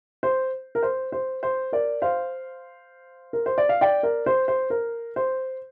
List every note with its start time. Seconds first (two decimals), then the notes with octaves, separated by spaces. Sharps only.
0.23 C5
0.75 A#4
0.83 C5
1.12 C5
1.43 C5
1.73 A#4 D5
2.02 C5 F5
3.33 A#4
3.46 C5
3.58 D5
3.69 F5
3.81 D5 G5
4.03 A#4 D5
4.26 C5
4.48 C5
4.70 A#4
5.16 C5